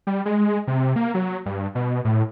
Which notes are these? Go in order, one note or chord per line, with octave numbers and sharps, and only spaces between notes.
G3
G#3
C3
A#3
F#3
G2
B2
A2